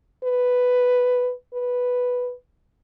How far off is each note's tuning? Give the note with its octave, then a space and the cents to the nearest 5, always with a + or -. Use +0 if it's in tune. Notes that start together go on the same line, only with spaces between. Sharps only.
B4 +5
B4 +0